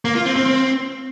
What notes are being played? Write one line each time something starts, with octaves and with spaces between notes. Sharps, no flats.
A#3
F4
C4
C4
C4